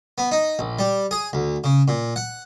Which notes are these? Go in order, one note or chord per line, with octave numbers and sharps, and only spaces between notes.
B3
D#4
A#1
G3
G#4
D2
C#3
A#2
F#5